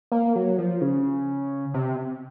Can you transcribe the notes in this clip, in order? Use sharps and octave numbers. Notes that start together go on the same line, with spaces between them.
A#3
F#3
F3
C#3
C3